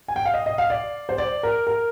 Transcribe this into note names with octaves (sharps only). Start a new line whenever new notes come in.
G#5
G5
F5
D#5
D#5
F5
D5
C5
D5
A#4
A#4